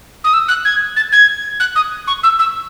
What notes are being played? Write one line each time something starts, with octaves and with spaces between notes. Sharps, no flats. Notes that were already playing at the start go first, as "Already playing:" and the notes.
D#6
E6
F#6
G#6
A6
G#6
F#6
D#6
C#6
E6
E6